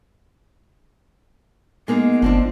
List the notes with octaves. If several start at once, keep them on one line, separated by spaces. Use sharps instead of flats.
G#3 A#3 B3 D#4
G1 F3 C4 D4